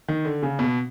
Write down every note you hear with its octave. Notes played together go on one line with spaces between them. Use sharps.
D#3
D3
C#3
B2